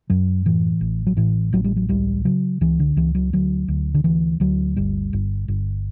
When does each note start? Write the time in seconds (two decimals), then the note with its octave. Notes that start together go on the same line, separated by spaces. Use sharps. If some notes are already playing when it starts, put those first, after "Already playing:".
0.10 F#2 F#3
0.46 A2 E3
0.81 A1
1.06 F#3
1.17 A2 E3
1.53 A1 F#3
1.64 G3
1.76 F#3
1.88 C#2 G3
2.25 C#3 F#3
2.61 C#2 E3
2.79 D3
2.96 C#2 E3
3.15 F#3
3.33 D2 F#3
3.68 D2
3.94 D3
4.04 D2 E3
4.40 D2 F#3
4.76 G1 G3
5.13 G1
5.48 G1